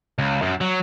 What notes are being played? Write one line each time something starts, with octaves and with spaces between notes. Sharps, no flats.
C#2
F#2
F#3